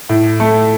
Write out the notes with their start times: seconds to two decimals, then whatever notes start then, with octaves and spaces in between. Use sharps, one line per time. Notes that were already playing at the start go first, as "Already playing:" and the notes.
0.09 A2
0.40 A3